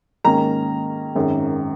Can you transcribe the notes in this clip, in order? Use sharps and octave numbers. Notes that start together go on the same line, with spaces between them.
G#2 D#3 A#3 C#4 A#5
G#1 F#2 D#3 G#3